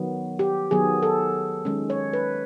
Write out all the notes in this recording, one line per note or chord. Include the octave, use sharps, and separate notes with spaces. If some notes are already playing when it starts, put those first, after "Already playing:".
Already playing: D#3 F#3 B3
G4
D#3 F#3 B3 G#4
A4
D#3 G#3 C#4
C#5
B4